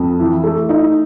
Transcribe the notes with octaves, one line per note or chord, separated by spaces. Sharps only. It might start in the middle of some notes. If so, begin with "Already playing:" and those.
Already playing: F2
E3
A3
D#4